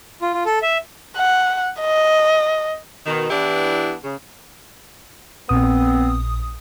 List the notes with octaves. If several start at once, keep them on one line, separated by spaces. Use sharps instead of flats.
F4
F4
A4
E5
F#5
D#5
B2 D#3
E3 B3 D4 E4 G4
C#3
A#1 B3 C4 D#6